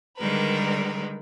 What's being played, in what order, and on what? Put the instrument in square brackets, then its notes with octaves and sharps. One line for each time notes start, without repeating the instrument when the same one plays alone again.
[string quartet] D3 D#3 G3 G#3 A#4 B4